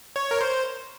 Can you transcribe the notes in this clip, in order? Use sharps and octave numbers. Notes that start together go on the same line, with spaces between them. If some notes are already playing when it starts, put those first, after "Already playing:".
C#5
A#4
C5